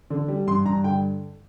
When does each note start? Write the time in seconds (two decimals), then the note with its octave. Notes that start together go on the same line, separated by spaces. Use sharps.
0.10 D3
0.28 G3
0.47 G2 C6
0.65 G2 A#5
0.84 D3 G5